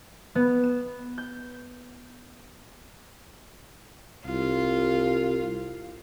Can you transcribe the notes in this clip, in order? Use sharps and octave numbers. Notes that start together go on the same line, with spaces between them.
B3
E7
G6
C2 F4